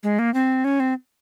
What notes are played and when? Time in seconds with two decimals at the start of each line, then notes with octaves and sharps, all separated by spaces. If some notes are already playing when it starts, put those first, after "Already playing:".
0.03 G#3
0.19 A#3
0.34 C4
0.64 C#4
0.80 C4